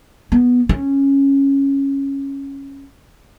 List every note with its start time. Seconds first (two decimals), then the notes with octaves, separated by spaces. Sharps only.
0.32 B3
0.69 C#4